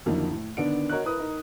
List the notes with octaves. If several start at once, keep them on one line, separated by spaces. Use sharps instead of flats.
F2 D3 D#3 F#3 A#3 E4
A2
D3 D#3 B3 D4 D7
F#4 A#4 C#5 D#5 F#6
E4 A#4 B4 D#6
D#4 A#4